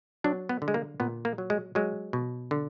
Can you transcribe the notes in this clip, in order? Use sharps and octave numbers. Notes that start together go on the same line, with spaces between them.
F#3 D4
B3
D3
G#3
A#3
A#2 B3
A#3
F#3
G#3
F#3 G#3
B2
D3